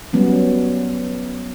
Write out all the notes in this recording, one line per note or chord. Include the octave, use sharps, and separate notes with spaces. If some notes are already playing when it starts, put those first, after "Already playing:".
F#3 G3 B3 C#4